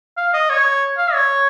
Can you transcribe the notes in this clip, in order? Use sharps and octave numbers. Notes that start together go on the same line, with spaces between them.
F5
D#5
C#5
F5
C#5